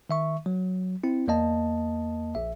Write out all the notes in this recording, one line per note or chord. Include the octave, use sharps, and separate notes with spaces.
D#3 E5 C#6
F#3
C4 E4
E2 A#3 D#5 A5
A#1 E5